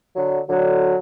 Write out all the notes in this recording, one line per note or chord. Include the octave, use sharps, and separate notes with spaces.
D3 F#3
D3 F#3